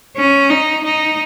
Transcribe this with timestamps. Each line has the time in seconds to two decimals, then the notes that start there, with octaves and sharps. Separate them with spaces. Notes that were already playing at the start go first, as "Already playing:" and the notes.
0.17 C#4
0.50 D#4
0.84 D#4